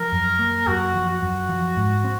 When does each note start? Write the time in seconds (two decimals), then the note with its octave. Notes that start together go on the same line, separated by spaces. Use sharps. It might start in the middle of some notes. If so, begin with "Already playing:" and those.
Already playing: F3 A#4
0.12 F#2
0.39 A#3
0.67 F#2 F#4
0.94 F3
1.08 F#4
1.22 F#2
1.49 F3
1.77 G#2
2.04 C4